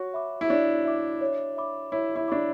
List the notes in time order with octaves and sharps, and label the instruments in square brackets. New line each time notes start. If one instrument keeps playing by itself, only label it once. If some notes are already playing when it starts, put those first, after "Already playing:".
Already playing: [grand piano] F#4 [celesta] C#5
[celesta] E5 B5 D6
[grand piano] E4
[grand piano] D4 [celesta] C#5
[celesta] E5 B5 D6
C#5
E5 B5 D6
[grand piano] E4 [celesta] C#5
[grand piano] E4
[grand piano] D4 [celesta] E5 B5 D6